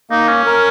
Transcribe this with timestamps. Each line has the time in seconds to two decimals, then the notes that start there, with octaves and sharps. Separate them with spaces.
0.10 A#3 D#4
0.28 C#4
0.46 A#4